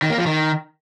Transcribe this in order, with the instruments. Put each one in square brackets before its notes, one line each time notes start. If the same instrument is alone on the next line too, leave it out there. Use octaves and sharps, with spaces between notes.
[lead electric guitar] D#3
A#3
F3
D#3